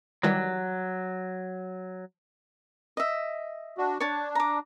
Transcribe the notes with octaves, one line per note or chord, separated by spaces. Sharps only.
D#3 E3 F#3 G3
D#5 E5
D4 F#4
D4 C#5 A5
A#5 D6